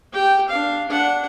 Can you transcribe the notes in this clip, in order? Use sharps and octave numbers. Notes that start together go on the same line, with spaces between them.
G4 G5
D4 F5
D4 F#5